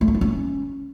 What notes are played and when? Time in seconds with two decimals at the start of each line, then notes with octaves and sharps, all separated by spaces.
0.01 A3
0.08 D4
0.15 E4
0.21 C#4